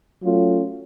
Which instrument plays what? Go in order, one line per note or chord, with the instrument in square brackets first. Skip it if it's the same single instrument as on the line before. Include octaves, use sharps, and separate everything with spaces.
[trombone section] F#3 A3 C#4 F4